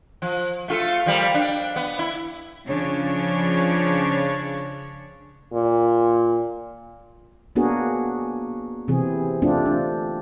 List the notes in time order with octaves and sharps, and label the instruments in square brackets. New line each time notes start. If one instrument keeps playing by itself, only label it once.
[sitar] F3
A3 F4 A4
F3 G3 A#3
D4
B3
E4
[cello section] C#3 F3 D4 C#5
[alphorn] A#2
[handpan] A#3 B3 D4 F#4 G#4 A#4
C3 E3 C4 G#4
A3 C4 D4 F4 G4
D4